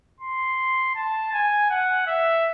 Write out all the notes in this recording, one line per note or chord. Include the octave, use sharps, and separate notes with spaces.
C6
A5
G#5
F#5
E5